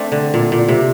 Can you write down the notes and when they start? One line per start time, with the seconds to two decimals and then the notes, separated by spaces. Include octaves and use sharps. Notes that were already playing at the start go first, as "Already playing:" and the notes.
Already playing: A3 C4 D4
0.12 D3
0.34 A#2
0.52 A#2
0.68 C3